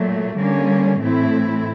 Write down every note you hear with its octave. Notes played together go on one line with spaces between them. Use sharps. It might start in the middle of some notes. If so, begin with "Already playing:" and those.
Already playing: A#2 F#3 A3
D3 G3 A#3 C#4
A2 E3 A3 C4 E4